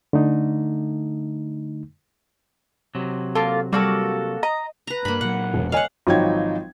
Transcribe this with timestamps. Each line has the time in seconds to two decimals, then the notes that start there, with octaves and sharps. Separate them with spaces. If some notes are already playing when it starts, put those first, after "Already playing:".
0.13 D3 A3 D#4
2.95 C3 F#3
3.35 A#3 F4 A4
3.73 G3 A#3 F#4 A4
4.43 D#5 A#5
4.87 B4 A#5
5.05 G2 A#3 B5
5.21 A#2 F#3 F#5
5.54 E1
5.72 C#5 D#5 F5 F#5 G#5
6.07 G#1 F3 F#3 D#4 G5 G#6